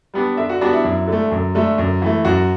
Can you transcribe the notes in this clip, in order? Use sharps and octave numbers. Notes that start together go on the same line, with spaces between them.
G3 B3 D4
D3 E5
F#4
G3 B3 D4 F#4
E4
F#2
D3 A3
F#2
D3 A3
F#2
E3 A3
F#2 F#4